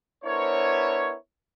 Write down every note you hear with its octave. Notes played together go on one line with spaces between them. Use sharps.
B3 D4 E4 A#4 C5 C#5